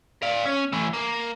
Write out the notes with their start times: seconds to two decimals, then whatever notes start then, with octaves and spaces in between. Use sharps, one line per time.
0.23 D5 F5
0.45 C#4
0.72 E3 A3
0.93 A#3